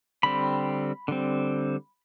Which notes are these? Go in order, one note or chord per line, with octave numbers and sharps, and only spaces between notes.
D3 G3 C4 B5
D3 G3 C4